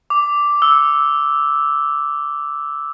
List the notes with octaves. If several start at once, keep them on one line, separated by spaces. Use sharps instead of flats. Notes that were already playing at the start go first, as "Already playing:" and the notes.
D6
E6